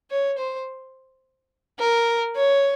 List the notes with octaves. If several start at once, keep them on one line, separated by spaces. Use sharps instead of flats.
C#5
C5
A#4
C#5